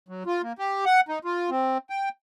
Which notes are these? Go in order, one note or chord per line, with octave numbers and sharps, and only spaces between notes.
F#3
F4
A#3
G4
F#5
D#4
F4
C4
G5